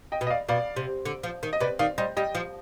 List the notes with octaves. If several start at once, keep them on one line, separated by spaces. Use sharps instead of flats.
D#5 G5
B2
D#5
D5 F5
B2 D5 F5
C3
D3
F3
D#3
D#5
C3 B4 D5
D#3 D5 F5
G3 C5 D#5
G3 D#5 G5
F3